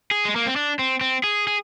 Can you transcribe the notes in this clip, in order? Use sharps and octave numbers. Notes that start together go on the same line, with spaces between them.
G#4
G#3
A#3
C4
D4
C4
C4
G#4
G#4